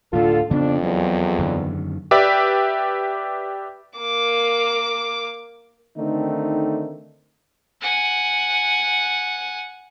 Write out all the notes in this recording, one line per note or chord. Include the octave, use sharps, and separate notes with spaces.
D2 A2 D3 F4 A4
F2 C#3 B3 D4
E2 F#3
F#2 D3 D#3
G4 B4 D5 E5
A#3 D6
D3 D#3 A3 C4 D#4
F#5 G#5